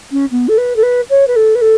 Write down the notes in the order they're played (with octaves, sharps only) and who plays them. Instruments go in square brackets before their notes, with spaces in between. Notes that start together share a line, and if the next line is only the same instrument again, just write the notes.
[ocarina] C#4
B3
A4
B4
A4
B4
C#5
B4
A4
B4
A4